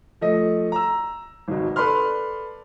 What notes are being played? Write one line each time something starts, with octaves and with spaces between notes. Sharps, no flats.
F3 A3 D#5
A#5 E6
G#1 B2
A4 B4 D5 B5 C6 F6